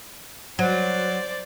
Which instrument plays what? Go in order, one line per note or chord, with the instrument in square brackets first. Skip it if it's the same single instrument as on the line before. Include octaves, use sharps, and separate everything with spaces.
[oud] F#3 [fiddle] C5 D5